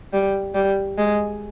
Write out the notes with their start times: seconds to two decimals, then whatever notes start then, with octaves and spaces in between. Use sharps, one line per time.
0.13 G3
0.54 G3
0.98 G#3